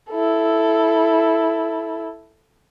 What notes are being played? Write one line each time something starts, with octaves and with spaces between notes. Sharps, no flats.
E4 A4